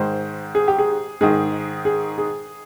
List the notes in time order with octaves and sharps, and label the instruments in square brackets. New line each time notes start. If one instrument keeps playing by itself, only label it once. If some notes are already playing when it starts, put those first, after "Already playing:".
Already playing: [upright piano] G#2 D#3 C5
G#4
G4
G#4
G#2 D#3 G#4
G#4
G#4